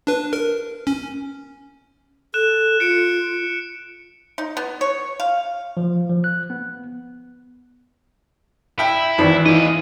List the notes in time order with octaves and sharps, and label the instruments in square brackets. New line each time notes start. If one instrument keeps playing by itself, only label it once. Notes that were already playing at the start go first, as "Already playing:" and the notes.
[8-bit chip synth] D4 B4
A#4
C#4
[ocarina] A4 [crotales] F#6 E7
[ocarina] F4 [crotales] C#7 D7
[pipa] D#4
B3
C#5
F5
[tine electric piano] F3
F3
F#6
B3
[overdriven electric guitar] E4 [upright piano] E5 G5
[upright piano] G#1 E3
[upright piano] E3 [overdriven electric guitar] F4 D#5